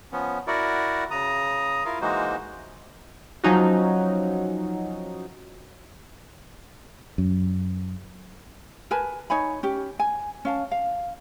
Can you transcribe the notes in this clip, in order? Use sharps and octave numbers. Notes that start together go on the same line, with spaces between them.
F3 B3 C#4
E4 F#4 A#4 D5 F#5
C#3 A#5 D#6
E4 F4 A#4 F5
E3 G#3 A#3 D#4 F#4 C5
F3 F#3 C#4 D#4 F#4
F#2
A#4 B4 G#5 A5
D#4 C#5 G#5 B5
C#4 G4
G#5
C#4 F5 A5
F5